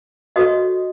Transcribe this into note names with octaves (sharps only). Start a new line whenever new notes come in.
F#4 A4 C#5 D#5 D#6